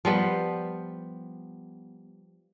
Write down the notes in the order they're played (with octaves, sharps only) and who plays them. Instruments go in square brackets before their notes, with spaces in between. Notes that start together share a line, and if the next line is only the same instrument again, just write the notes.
[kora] F3 G3 B3